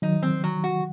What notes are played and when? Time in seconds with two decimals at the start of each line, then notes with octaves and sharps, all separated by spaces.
0.02 D#3 F#3 D#4
0.23 C4
0.44 F#3
0.64 F#4